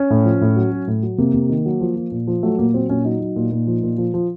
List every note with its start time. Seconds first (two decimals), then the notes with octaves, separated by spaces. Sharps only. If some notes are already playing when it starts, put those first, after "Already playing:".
Already playing: C#4
0.10 A2
0.25 F3
0.41 A2
0.56 F#3
0.72 F#3
0.87 A2
1.03 F#3
1.18 C3 A#3
1.34 C3
1.49 D#3
1.66 F#3
1.81 F3
1.96 F3
2.12 A#2
2.27 F3
2.43 F#3 A3
2.59 A#2 A#3
2.74 F#3 C4
2.89 A#2 C#4
3.05 F#3 D#4
3.20 F#3
3.36 A#2
3.51 A#2
3.67 F3
3.83 A#2
3.98 F3
4.14 F3